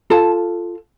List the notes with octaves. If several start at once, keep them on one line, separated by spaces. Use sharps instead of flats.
F4 A4 A5